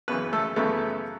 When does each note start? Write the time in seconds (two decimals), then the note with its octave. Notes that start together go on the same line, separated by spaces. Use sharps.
0.08 F#2 C#3 E3 B3 B4
0.33 A3 A4
0.56 F#2 C#3 E3 A3 B3 A4